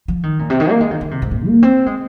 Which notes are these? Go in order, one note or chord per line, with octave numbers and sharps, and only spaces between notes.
F3
D#3
A#2
C3
D#3
A#3
G#3
D#3
D#3
C3
G#2
A#2
A#3
C4
G#3